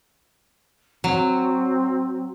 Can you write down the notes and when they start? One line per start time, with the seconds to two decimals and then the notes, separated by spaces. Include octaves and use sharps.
1.04 F#3 C4